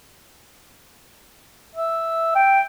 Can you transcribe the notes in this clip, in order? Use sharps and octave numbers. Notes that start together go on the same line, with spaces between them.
E5
G5